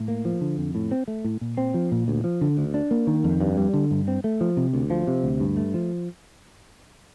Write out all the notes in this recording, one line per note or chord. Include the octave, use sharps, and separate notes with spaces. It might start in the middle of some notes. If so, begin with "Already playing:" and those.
Already playing: A2
A#3
F3
D3
F2
A2
C4
A3
A2
A#2
C4
F3
A#2
D2
F3
D3
D2
D4
A#3
D#3
F2
G2
G3
D3
G2
C4
A3
F3
C3
D2
F3
C3
D2
G2
A3
F3